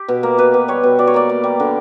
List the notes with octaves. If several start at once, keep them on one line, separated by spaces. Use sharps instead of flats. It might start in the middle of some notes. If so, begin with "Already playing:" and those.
Already playing: G4
B2
A#3
B2 B4
B2
G3 C#5
B2
B2 D5
C#5
A#3 D5
A#3
G3
D3